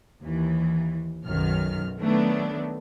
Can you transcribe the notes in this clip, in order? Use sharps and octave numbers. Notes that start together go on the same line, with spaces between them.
D#2 E3
B1 F#2 D#3 F6
D#3 F#3 A3 B3 D4